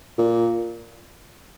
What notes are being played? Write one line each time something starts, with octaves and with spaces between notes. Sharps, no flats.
A#2